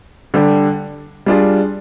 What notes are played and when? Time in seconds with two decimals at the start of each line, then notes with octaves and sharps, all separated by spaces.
0.34 D3 G3 D4 G4
1.26 G3 D4 F4 G#4